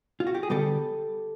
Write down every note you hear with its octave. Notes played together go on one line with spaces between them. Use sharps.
F4
F#4
G4
G#4
D3 G3 B3 G4 A4